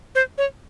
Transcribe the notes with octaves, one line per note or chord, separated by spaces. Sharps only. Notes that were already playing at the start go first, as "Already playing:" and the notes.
C5
C#5